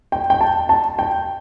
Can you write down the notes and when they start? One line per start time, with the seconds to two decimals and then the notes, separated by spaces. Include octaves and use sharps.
0.12 G5
0.30 G5
0.41 A5
0.69 A5
0.99 G5